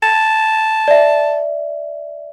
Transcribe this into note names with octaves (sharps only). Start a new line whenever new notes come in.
A5
D5 E5